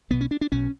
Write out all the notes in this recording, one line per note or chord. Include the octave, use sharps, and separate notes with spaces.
B1 B2 B3
C#4
D4
D4
B1 B2 C#4